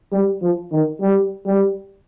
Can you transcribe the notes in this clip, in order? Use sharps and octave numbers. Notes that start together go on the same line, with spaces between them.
G3
F3
D#3
G3
G3